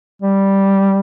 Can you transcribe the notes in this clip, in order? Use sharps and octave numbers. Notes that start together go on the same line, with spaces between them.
G3